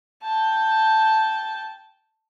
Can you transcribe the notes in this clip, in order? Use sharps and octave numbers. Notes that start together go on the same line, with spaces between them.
G5 A5